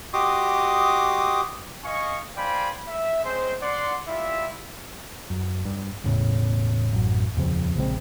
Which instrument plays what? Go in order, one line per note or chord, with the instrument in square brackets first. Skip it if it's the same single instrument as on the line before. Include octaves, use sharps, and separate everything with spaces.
[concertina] F#4 G4 D#5 C6 D6 D#6
[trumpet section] D#5 F5 G#5 C#6
C5 D5 F5 G5 G#5 B5
E5
G#3 C4 C#4 C5
D5 F#5 C6
G3 E4 F4 E5
[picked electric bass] F#2
G2
E1 E2 A2 C#3
A1 F#2
D#1 F2 C#3 F3
A#1 C#3 G#3 C4